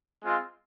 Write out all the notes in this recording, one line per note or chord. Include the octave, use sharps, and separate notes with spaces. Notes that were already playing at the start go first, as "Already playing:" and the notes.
G#3 C4 F4